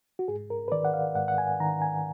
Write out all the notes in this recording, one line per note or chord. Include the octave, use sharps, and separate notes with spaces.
F#4
G#2 G#4
A#4
B4
D#3 D5
F#5
F5
G#2 F#5
F#5
G#5
D#3 A#5
G#5